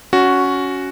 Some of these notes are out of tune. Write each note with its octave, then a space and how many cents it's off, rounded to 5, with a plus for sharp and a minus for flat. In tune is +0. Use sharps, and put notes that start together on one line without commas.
C#4 +15 F#4 +0